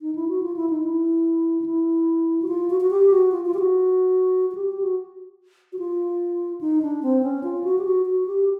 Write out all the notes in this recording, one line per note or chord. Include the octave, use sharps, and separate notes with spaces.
D#4
E4
F#4
F4
E4
D#4
E4
D#4
E4
F#4
F4
F#4
F#4
G4
F#4
F4
F4
G4
F#4
F#4
G4
G4
F#4
F#4
F4
D#4
D4
C4
C#4
F4
F#4
G4
F#4
F#4
G4